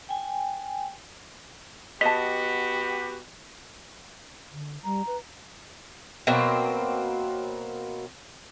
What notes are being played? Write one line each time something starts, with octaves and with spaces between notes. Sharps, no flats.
G5 G#5
B3 F#4 G4 B4 D#5 A5 B6
D3
G3 A#5
B4
B2 F#3 A#3 C4